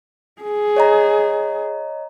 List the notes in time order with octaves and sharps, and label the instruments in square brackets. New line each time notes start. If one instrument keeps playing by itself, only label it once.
[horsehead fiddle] G#4
[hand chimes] C#5 D#5 A#5